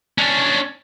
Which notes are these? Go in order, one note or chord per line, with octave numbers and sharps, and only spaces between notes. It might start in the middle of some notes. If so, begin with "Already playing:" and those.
C#4 D4